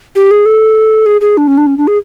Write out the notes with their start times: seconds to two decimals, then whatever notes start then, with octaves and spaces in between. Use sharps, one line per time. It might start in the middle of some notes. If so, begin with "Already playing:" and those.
0.16 G4
0.31 G#4
0.46 A4
1.06 G#4
1.21 G#4
1.37 D4
1.47 C#4
1.58 D4
1.67 C#4
1.78 D4
1.87 G#4